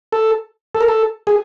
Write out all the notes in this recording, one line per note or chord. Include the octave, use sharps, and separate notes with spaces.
A4
A4
A#4
A4
G#4